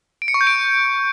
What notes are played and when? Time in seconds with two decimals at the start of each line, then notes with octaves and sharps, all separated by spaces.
0.22 D7
0.28 C#7
0.34 C#6
0.41 G6
0.47 D7